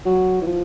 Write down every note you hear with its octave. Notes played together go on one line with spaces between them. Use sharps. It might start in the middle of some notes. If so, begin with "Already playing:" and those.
F#3
E3
F3